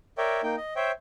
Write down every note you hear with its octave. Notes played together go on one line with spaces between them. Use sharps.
A#4 C#5 D5 E5 G5
A#3 D#4 G5
D#5
C5 C#5 E5 G5